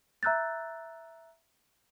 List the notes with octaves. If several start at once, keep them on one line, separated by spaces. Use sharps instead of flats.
E5 A#5 E6 F#6 G6 A6